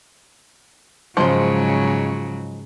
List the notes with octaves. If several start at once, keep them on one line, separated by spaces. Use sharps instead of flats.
G#2 C#3 F3 F#3 G#3 C5